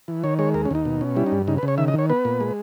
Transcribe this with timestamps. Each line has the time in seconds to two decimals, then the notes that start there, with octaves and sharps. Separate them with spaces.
0.08 E3
0.24 D#3 C#5
0.39 G#3 C#5
0.54 D#2 A#4
0.65 C#4
0.71 D#2 D#4
0.85 B2
1.01 C#4
1.16 G3 E4
1.26 D#4
1.32 G2
1.48 C#3 D#4
1.58 B4
1.63 C#3
1.68 C#5
1.78 D#3 E5
1.88 D#5
1.94 D#3 C#5
2.10 B3 B4
2.25 A#2
2.40 G#3